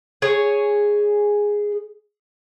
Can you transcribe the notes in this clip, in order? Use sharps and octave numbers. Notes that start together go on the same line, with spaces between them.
G#4 C#5